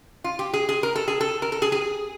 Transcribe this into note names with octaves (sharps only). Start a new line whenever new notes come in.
F4
G4
G#4
G#4
A#4
A4
G#4
A4
A#4
A4
G#4
G#4